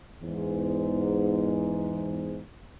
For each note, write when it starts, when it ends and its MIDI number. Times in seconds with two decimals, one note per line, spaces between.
0.22 2.38 40
0.22 2.38 44